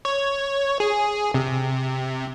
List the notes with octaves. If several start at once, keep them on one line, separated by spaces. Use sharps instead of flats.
C#5
G#4
C3